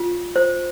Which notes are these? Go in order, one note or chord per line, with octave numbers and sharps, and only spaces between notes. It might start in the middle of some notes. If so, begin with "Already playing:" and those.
Already playing: F4
C5